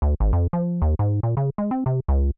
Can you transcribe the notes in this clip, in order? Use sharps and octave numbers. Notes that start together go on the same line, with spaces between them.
D2
G#1
F2
F3
D#2
G#2
A#2
C#3
G#3
C4
C3
C#2